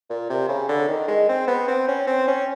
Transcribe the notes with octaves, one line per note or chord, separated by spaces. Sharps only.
A#2
C3
C#3
D3
D#3
G#3
C4
B3
C4
C#4
C4
C#4